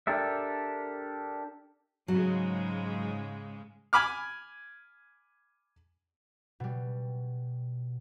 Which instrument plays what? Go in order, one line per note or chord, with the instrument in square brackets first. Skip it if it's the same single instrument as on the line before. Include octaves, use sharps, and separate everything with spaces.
[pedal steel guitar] D4 G4 A4 A#4 E5
[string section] G#2 C#3 G#3 [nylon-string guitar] F#3
[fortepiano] G#5 B5 D6 F6
[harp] B2 G3